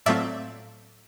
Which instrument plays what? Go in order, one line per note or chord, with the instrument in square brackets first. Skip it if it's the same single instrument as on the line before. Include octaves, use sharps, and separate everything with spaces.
[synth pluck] A2 F#3 A3 C4 F4 D5 E5